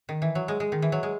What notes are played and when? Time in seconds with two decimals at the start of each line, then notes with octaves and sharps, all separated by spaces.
0.09 D#3
0.22 E3
0.35 F#3
0.48 G#3
0.60 G#3
0.72 D#3
0.82 E3
0.92 F#3
1.03 G#3